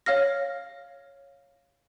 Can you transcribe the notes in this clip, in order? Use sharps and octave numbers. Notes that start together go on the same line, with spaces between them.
C#5 F5 F6 A#6